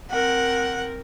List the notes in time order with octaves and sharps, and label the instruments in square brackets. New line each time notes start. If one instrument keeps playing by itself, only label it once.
[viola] C4 A#4 [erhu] F#5